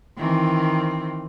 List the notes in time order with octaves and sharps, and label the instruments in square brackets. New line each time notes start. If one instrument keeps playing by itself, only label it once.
[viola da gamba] D#3 E3 C4